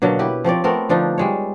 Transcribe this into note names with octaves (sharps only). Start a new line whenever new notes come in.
B2 D3 F#3 A#3
E4 G4 B4
F3 C4 C#5 D5
A3 B3 C4 A#4
D3 F3 D4 D#4
G3 G#3 C#5